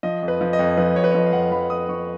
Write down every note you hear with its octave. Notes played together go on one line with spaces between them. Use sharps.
F3 D#5
F2
B4
F3
D#5
F2
F3 B4
F2 C#5
B4
C#5
F3 D#5
F5
F2 F#5
F3 B5
F2 D#6
F3 C#6